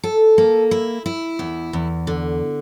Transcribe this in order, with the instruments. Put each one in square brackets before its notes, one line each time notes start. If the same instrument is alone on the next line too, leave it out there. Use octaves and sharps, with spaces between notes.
[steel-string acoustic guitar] A4
A#3
E4
E4
E2
E2
D3